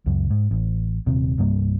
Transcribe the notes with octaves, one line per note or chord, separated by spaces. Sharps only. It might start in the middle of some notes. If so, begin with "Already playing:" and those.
C#2 F#2
G#2
A1
D#1 C3
C2 G2 G3 A#3